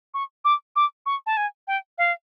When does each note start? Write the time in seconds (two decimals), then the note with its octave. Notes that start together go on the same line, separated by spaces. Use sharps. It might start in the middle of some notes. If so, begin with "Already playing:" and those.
0.14 C#6
0.45 D6
0.76 D6
1.06 C#6
1.26 A5
1.37 G#5
1.67 G5
1.98 F5